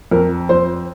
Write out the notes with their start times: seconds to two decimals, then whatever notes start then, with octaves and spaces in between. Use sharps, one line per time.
0.11 F2 A#4
0.49 F2 C5